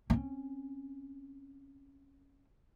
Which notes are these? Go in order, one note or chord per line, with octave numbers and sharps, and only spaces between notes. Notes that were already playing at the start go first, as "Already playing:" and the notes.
C4 C#4